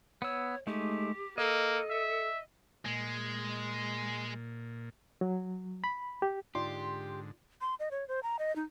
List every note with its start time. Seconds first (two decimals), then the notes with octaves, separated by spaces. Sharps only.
0.22 B3 C#5 E6
0.67 G#3 A3 D#4 G4
1.38 A#3 A4 D#5
1.90 E5
2.86 A#2 G#3
5.21 F#3
5.84 B5
6.22 G4
6.55 G#2 D3 D#4 F4 G4 D5 C6
7.61 C6
7.80 D#5
7.91 C#5
8.08 C5
8.23 A#5
8.39 D#5
8.56 D#4